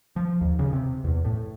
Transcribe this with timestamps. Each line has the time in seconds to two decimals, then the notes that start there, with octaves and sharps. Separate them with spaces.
0.16 F3
0.41 D#2
0.59 C#3
0.73 C3
1.04 E2
1.25 A2